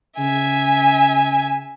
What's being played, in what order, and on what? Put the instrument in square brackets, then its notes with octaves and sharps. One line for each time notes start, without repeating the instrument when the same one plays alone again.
[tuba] C#3 [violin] E5 G#5